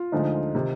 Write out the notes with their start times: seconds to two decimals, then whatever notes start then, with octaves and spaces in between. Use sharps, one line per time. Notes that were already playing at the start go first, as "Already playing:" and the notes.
Already playing: F4
0.12 D2 D3 F3 G#3 D#4
0.55 C3 D#3